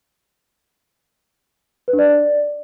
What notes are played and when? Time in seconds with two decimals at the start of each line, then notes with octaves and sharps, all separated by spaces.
1.88 B4
1.93 D4
1.99 D5